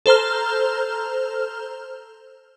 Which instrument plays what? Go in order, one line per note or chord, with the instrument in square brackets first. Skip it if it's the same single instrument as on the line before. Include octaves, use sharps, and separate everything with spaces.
[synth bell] A4 C5 A#5 F6